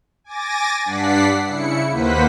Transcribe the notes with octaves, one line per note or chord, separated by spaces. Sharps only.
G#5 D6 A6 A#6
G2 D4 D5 F#5 B6 C7
C#3 E4 C#7
D#2 A#3 B4 C5 F#5 B6